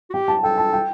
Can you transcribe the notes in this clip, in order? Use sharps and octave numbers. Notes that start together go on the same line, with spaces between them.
F#4
G4 G5
A5
A4 G5
A5
G5